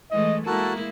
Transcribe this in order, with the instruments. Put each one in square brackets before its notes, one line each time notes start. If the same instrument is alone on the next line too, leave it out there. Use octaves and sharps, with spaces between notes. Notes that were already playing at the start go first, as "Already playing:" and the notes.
[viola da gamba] E3 G#3 A3 [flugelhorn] D#5
[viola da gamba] G#3 A#3 E4 [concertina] F#4 A4 A5 [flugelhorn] A#4